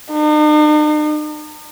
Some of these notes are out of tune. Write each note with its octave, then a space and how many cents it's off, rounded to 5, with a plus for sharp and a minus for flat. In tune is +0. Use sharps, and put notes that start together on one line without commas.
D#4 -45